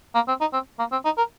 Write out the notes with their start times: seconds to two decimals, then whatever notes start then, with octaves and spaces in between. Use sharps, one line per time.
0.15 A#3
0.28 C4
0.41 D#4
0.53 C4
0.79 A#3
0.92 C4
1.05 D#4
1.18 A#4